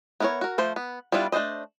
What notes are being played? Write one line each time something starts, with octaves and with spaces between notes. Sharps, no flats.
B3 E4 A#4 B4 C#5
F#4 A#4
F3 A3 C5
B3
G3 B3 D4 E4 F4
A3 D4 F4 C5 D#5